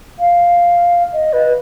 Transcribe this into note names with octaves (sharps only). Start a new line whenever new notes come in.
F5
D#5
B4